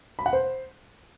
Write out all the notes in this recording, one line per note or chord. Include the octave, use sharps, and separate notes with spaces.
B5
F#5
C5